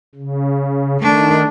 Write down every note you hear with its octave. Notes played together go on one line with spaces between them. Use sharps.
C#3
D#3 A3 D4